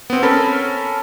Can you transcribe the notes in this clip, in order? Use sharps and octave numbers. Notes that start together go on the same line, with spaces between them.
B3 C4
C#4 A4 A#4 A5 B5